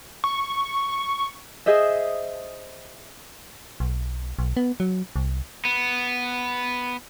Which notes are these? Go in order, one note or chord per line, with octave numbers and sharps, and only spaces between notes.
C#6
G#4 C5 D#5 E5
B1
B1
B3
F#3
C2
B3